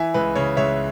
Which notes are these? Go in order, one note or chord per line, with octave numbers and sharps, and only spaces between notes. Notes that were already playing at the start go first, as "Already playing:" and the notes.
Already playing: E3 E5 G#5
C#2 B4
C#3 C#5
C#2 C#5 E5